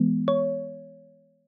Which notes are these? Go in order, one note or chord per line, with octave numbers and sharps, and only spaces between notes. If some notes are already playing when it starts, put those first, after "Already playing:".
Already playing: E3 G#3 B3
C#5